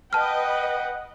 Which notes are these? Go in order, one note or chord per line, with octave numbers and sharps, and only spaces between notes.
B4 D#5 F#5 G5 A5 F6